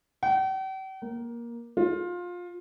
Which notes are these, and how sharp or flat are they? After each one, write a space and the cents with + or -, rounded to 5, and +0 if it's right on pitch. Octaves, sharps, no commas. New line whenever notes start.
G5 -45
A#3 +15
F4 +20